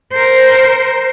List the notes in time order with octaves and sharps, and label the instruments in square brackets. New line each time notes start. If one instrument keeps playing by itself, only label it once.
[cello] A#4 C5